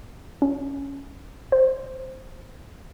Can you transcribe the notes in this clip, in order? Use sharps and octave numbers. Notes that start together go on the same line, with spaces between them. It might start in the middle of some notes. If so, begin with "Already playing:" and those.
C#4
C5